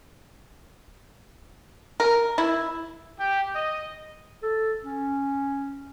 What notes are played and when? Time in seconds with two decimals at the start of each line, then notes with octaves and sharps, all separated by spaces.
2.00 A#4
2.38 E4
3.17 G4
3.54 D#5
4.43 A4
4.83 C#4